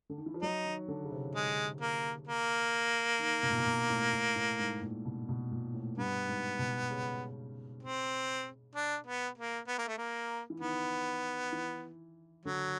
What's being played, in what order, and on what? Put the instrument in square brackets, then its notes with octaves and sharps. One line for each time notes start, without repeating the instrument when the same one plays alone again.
[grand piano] D3
D#3
E3
F3
[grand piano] F#3 [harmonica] D#4
[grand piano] D#3
D3
C#3
C3
[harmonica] G#3
A#3
A#3
[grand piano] D#3
B2
A#2
B2
A#2
A2
A2
A2
G#2
A#2
B2
B2
A#2
A2
[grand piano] G2 [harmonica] B3
[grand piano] G#2
B2
C#3
[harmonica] C4
D4
B3
A#3
B3
A#3
A3
A#3
[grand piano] E3
[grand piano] D#3 [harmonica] B3
[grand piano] E3
[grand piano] D3 [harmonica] F#3